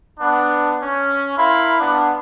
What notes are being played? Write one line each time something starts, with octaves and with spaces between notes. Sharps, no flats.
B3 D4
C#4
E4 A#4 F5 B5 C6
B3 D4